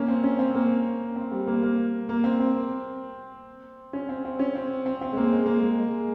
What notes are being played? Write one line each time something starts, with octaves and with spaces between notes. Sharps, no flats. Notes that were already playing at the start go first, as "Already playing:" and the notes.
Already playing: A#3 C#4
C4
C#4
C4
A#3
C4
G3
A#3
A#3
A#3
C4
C4
C#4
C4
C4
C#4
C4
C4
C4
G#3
A#3
G#3
A#3
G#3
G#3